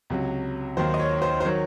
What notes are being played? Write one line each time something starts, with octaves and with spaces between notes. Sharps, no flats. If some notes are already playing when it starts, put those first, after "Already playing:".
C#2 C3 F#3
D#2 D#3 F#3 C5
D#5
C#5
C5
C5
D#3 F#3 C#5